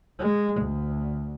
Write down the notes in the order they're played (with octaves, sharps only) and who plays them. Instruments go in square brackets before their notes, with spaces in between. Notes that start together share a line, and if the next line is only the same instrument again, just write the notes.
[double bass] G#3
D2